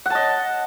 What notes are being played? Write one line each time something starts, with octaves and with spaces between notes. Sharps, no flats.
D#5 F#5 A5